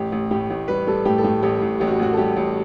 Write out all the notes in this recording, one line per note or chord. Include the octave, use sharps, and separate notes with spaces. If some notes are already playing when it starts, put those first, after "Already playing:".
Already playing: A1 G4
A1
A2 G4
A1
G3 B4
G3 A4
A2 G4
A4
A2 G4
A1 G4
A1
A1 G4
F#4
A1 F#4
A4
G3 G4
A1